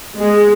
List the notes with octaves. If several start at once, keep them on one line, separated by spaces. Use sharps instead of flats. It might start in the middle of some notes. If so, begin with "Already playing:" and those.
G#3